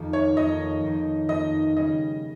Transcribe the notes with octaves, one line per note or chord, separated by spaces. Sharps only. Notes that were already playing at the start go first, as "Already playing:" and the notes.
Already playing: F2 D#3 A#3 D#4
C#5
F2 D#3 A#3 D#4 D#5
F2 D#3 A#3 D#4
F2 D#3 A#3 D#4 D#5
C#3 G3 C#4 G#4 D#5